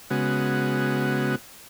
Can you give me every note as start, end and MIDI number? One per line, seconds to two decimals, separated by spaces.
0.10 1.35 49
0.10 1.35 56
0.10 1.35 59
0.10 1.35 66